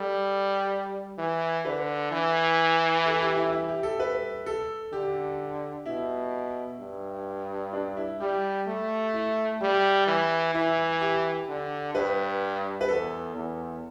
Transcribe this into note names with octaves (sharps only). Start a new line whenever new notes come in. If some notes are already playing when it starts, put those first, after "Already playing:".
Already playing: G3 A4
E3
D3 B4
E3
A4
E4
G4
E4
E4
G4
A4
B4
A4
D3 G4
B2 E4
G2
D4
E4
G3 G4
A3
E4
G3 G4
E3
E3 E4
G4
D3
G2 B4
B4
E2 A4
E2